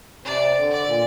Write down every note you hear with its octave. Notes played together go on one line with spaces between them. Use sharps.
C3 D5
D3
D5
A#2